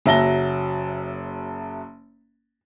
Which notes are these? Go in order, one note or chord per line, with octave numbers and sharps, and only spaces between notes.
F#1 F#3 E5 A5 A#6 G7